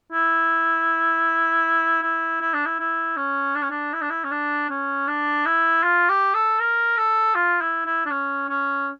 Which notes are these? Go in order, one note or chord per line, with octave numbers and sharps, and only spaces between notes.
E4
E4
E4
D4
E4
E4
C#4
D4
C#4
D4
E4
D4
E4
C#4
D4
C#4
D4
E4
F4
G4
A4
A#4
A4
F4
E4
E4
D4
C#4
C#4